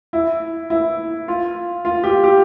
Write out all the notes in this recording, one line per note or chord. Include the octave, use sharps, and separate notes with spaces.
E4
E4
F4
F4
G4
G4